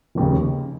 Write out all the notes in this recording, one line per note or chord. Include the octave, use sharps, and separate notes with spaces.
F1 D#2 C#3